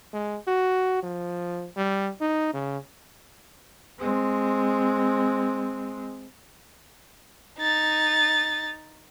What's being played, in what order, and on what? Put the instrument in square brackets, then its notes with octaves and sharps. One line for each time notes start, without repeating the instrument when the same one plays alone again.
[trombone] G#3
F#4
F3
G3
D#4
C#3
[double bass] G#3 C4
[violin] D#4 A6